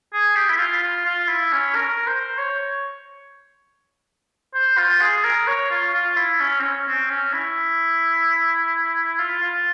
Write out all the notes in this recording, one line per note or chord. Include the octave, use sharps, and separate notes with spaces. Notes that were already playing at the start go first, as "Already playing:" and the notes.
G#4
G4
E4
F4
F4
F4
E4
C#4
A#4
C5
C#5
C5
F4
G#4
A#4
C#5
F4
F4
E4
C#4
C4
C#4
C4
C#4
E4
F4
F4